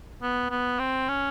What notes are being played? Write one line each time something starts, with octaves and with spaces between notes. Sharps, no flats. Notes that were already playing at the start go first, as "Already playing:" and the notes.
B3
B3
C4
C#4